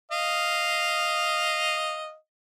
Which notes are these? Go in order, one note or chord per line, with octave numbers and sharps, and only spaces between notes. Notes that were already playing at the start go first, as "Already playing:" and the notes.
D#5 F5